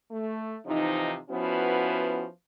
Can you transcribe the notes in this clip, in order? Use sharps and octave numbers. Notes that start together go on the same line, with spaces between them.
A3
C3 E3 F3 D#4
F3 B3 C#4 E4 F#4 B4